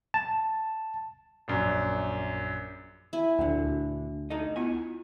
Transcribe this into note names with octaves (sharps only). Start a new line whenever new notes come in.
A5
A#1 F#2
E4 G#5
D2 A#2 D3
D#4 A4 D#5
B3 E4 F4 G#5